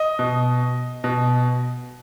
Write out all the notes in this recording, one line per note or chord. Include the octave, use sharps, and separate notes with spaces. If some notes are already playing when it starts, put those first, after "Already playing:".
Already playing: D#5
B2
B2